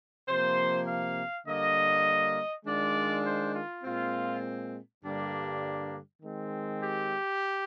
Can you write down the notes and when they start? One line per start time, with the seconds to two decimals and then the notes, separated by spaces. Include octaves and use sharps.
0.28 C3 F3 A#3 C5
0.86 F5
1.46 D3 G3 A#3 D#5
2.65 D#3 G#3 D4 F4 D5
3.25 C5
3.54 F4
3.84 A#2 G#3 C4 F4
5.03 G2 D3 G3 A#3 D4
6.22 D#3 G#3 C4
6.81 G4